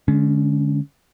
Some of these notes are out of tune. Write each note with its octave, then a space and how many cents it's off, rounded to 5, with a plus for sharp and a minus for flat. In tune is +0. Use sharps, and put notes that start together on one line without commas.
D3 +0 G#3 +20 C#4 +20